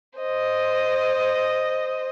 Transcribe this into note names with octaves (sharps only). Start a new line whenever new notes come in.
C5 D#5